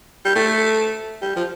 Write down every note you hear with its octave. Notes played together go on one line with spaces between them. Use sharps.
G3
A3
G3
F3